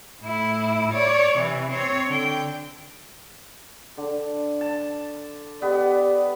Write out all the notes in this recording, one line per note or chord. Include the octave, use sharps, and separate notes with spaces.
A2 E4
C#5 D5
C3 E3
C4 C#5
D3 G5
D3
A5
B3 G4 B4 D5 D#5